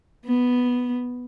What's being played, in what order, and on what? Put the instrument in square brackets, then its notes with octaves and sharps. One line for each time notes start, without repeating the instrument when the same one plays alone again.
[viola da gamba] B3